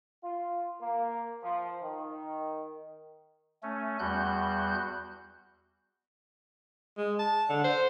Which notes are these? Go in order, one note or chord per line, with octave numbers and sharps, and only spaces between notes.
F4
A#3
F3
D#3
A3 C#4
E2 G3 F#4 F#6 G6
G#3
A5
D3
C5